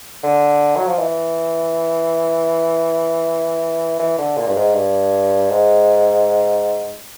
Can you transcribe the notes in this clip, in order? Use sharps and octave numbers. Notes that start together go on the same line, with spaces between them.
D3
F#3
F3
E3
E3
D3
A#2
G2
G#2
G2
G#2